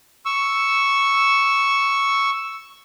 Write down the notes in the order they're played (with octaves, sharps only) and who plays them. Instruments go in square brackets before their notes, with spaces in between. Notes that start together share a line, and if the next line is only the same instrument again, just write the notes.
[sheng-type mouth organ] C#6 E6